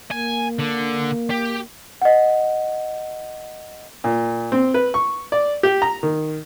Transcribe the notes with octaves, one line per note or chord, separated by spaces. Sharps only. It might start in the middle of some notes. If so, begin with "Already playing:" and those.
A#3 G#5
D3
G4
D#5 F#5
A#2
C4
B4
C#6
D5
G4
A#5
D#3